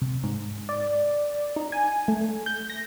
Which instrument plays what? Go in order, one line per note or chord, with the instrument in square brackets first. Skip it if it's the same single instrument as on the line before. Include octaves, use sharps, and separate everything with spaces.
[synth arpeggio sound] C3
G#2
D5
D#4
G#5
A3
G6
A#6